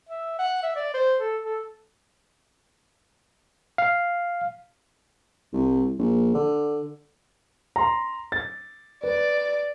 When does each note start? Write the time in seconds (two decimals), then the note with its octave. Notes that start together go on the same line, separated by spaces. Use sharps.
0.09 E5
0.39 F#5
0.63 E5
0.76 D5
0.94 C5
1.20 A4
1.44 A4
3.78 F5
5.53 C2
5.99 A#1
6.34 D3
7.76 A#5 C6
8.32 A6
9.04 B4 D5